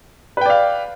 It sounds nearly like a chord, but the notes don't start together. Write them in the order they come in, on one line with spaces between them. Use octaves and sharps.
B4 G5 D5 F5